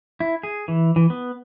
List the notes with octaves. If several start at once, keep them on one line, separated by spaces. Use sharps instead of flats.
E4
G#4
E3
E3
B3